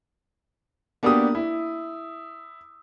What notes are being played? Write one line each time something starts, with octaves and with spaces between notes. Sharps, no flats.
A#3 B3 D4 F#4 G4 D#6
E4